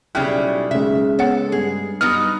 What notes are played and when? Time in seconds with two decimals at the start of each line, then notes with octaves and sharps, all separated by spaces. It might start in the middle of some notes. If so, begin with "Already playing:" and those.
0.15 B1 C#3 G3 E4 G5 F6 F#6
0.71 C#3 G#3 E5
1.19 B3 A4 C#5 F#5
1.52 G2 G#4
2.01 G2 F#3 B3 D#4 F6